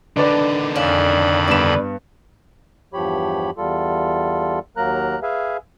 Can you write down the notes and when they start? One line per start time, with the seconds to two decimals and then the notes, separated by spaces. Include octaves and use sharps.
0.17 D3 D#3 D4 B4 D5
0.76 F2 C#4 D4 F5 B5
1.48 G2 B3 B4 D5 E7
2.94 E2 G2 F3 G4 C#5 B5
3.57 E2 G3 F4 A4
4.77 D#2 F#3 A#3 A#4 A#5 F#6
5.23 G#4 B4 E5 F5 G#5